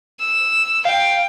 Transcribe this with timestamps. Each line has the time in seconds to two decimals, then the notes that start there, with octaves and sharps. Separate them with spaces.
0.20 E6
0.86 F5 G5